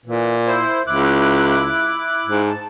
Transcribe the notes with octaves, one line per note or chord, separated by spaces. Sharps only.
A#2 E3
E4 C5
C#2 E4 D6 F#6
G#2
A5